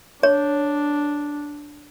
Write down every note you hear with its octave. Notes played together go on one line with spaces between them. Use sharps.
D4 C#5